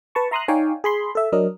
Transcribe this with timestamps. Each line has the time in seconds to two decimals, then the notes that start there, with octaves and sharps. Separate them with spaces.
0.15 B4 A5 C#6
0.31 E5 A#5 C6 D#6 F6 F#6
0.48 D#4 C#5 D5 F5 G5 G#5
0.84 G#4 B5 C6
1.15 A4 E5
1.32 F#3 D4 A#4 D#5